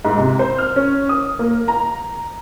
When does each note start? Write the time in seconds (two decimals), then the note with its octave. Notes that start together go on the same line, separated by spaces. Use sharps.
0.05 G#2
0.18 C3
0.39 C5
0.58 F6
0.76 C#4
1.09 D#6
1.39 A#3
1.68 A#5